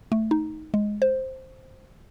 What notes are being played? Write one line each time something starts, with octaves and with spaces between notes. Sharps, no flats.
A3
D#4
G#3
C5